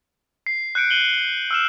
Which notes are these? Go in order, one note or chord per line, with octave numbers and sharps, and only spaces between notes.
C7
F#6 G6 C#7 D7
D#7 F#7 G7
E6 F6 E7